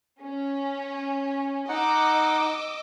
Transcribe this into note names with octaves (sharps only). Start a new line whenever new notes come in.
C#4
D#4 D#5 F#5 D6 E6